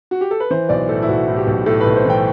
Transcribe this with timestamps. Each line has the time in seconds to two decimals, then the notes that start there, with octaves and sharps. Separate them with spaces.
0.11 F#4
0.21 G4
0.31 A4
0.40 B4
0.50 E3 C5
0.69 B1 D5
0.89 A2 A4
1.02 E4
1.08 B1 F#4
1.28 A2
1.37 G4
1.47 B1
1.66 A2 A4
1.80 B4
1.86 B1
1.96 C5
2.05 E3 G5